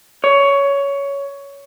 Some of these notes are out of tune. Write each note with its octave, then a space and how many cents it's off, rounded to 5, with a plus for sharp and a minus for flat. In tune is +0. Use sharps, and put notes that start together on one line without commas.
C#5 +15